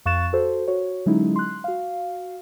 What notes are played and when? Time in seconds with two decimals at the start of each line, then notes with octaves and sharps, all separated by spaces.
0.06 F2 F5 C#6 F#6 A6 E7
0.33 F#4 A4 C5
0.68 F#4 C#5
1.06 D3 F#3 G#3 C#4 D#4 E4
1.36 C6 F#6
1.64 F#4 F5